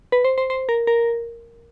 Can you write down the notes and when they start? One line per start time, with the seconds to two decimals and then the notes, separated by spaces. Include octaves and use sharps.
0.12 B4
0.25 C5
0.38 C5
0.50 C5
0.69 A#4
0.87 A#4